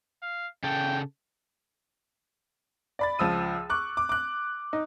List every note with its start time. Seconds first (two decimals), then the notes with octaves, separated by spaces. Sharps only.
0.23 F5
0.64 C#3 A4 G5
2.99 D5 B5 A6
3.19 C#2 F3 E6 D#7
3.70 C#6 D6 F#6
3.97 D6
4.09 D6 F#6
4.73 D#4